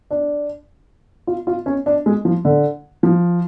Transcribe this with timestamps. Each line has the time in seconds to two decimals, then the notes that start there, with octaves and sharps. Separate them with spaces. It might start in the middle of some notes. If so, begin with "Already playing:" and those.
0.11 D4
1.27 F4
1.47 F4
1.66 C#4
1.86 D4
2.06 G#3
2.25 F3
2.45 D3
3.03 F3